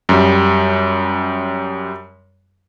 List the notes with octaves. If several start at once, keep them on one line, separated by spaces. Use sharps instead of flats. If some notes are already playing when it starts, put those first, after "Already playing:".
F#2 G3